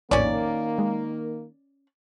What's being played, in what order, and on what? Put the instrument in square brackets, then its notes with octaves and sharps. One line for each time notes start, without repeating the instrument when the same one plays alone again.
[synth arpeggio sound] A#1 F2 A2 [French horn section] D#3 A#3 A#4 [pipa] C#4 D5
[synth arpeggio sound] G#3